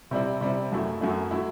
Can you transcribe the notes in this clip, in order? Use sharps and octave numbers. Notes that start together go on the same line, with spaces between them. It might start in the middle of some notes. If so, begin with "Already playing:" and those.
C3 G3 C4 E4
C3 G3 C4 E4
F#2 F#3 A3 E4
F#2 F#3 A3 E4
F#3 A3 E4